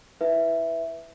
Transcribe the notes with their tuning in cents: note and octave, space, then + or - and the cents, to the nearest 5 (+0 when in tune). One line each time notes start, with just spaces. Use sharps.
E4 -10 B4 +5 E5 +0